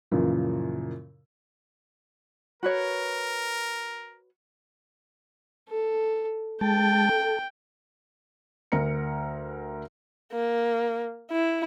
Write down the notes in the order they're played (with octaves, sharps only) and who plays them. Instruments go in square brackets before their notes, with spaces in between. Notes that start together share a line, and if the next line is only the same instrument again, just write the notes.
[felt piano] F#2 A#2 C#3 E3 F3
[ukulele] F#4 B4 C#5 [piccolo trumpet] A#4
[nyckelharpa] A4
[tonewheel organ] G#3 A5 [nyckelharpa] G5
[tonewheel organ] A4
[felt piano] D2 A#4 A#5 C#7
[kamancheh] A#3
E4